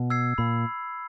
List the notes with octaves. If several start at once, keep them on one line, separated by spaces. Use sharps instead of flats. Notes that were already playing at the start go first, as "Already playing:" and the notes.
Already playing: B2
E6 G#6 C7
A#2 B5